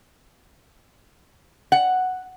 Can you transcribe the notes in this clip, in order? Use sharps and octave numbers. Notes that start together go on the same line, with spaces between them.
F#5